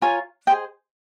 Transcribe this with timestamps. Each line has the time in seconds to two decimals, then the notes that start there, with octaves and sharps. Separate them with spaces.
0.01 F4 A#4 C#5 G#5
0.47 G#4 C5 D#5 G5